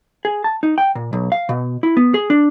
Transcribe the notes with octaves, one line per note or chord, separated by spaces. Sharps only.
G#4
A5
D#4
G5
A#2
B1
F5
B2
E4
B3
G#4
D4